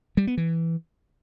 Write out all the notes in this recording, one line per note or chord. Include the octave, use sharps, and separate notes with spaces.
G3
B3
E3